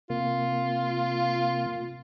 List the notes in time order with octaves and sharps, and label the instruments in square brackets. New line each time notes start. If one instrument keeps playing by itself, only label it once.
[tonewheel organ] C3 A#3 [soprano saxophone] F4